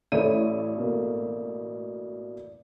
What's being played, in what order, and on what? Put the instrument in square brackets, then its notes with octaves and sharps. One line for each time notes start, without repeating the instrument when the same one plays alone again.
[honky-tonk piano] A1 A3 D#7 [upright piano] E4 C#5 E5 [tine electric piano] D5
[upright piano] B2 A#3